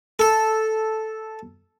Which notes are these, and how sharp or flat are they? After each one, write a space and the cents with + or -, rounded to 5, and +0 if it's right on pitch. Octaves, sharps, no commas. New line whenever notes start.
A4 -5